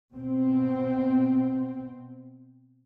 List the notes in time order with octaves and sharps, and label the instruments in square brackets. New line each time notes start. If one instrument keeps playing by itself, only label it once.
[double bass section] B2 C4